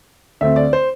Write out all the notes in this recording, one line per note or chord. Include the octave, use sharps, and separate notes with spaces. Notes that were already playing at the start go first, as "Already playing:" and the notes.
D2 D3 A3 C4 E5
D5
C5